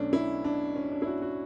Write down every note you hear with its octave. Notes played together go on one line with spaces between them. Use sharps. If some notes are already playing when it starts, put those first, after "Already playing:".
Already playing: B1 B2 A3 C#4 D4
E4
D4
C#4
D4
E4
F#4
F#4